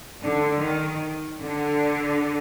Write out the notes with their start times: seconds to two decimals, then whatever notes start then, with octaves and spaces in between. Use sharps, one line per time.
0.21 D3
0.60 D#3
1.40 D3